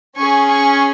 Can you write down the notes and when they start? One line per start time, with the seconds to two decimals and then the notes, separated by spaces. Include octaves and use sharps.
0.17 C#4 G#4 G#5 C#6
0.49 G#5 C#6